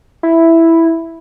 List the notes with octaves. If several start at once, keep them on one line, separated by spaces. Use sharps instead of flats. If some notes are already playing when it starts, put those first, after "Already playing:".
E4